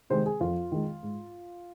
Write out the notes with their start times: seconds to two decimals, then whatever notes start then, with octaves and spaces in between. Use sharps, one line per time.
0.10 C3 D#3 G#3 C5
0.26 G#4
0.40 F2 F4
0.72 D#3 G#3
1.03 G#2